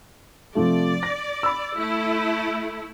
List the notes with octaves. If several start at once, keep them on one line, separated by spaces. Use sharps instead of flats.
C3 F3 A3 D5
A#6
B5 E6
A3 E4